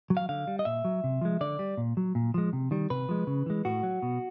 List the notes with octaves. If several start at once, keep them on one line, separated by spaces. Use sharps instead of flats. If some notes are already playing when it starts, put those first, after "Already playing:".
F#3
F5
D3 F5
G3
D#5
A#2 E5
F#3
C3
F3 G#3
D3 D5
G3
A#2
F#3
A#2
F3 G#3
C3
D#3 G3
C3 B4
F3 G#3
C#3
E3 G#3
A2 F#4
F#3
B2